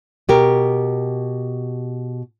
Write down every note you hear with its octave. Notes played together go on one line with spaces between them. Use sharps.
B2 G4 A#4